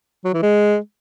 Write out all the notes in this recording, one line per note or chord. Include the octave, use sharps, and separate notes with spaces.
F#3
E3
G#3